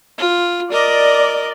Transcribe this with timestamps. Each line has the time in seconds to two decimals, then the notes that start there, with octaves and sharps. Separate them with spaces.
0.18 F4
0.72 A#4 D5 D#5